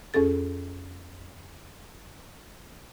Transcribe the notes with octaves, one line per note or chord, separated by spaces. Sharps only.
F2 C#4 G#4 A4 A6